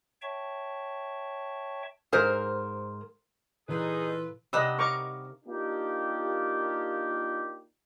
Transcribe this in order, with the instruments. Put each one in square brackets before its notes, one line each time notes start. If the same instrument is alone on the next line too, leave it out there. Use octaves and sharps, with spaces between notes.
[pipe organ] C#5 E5 G5 A5 C#6
[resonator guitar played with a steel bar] G#2 A#4 C5
[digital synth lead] A#2 [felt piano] E3 [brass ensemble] D#4 G#4 [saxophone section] F4 A4 B4
[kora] C3 D4 D#4 [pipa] G3 F#5 [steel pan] D#5 E6
[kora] A#4 D#5 F5 [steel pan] A#5 C#6 D6
[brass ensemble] A#3 D4 D#4 F4 G4